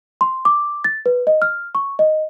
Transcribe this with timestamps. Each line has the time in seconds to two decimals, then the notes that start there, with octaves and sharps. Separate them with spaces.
0.21 C6
0.45 D6
0.84 A6
1.06 B4
1.27 D#5
1.42 F6
1.75 C#6
1.99 D#5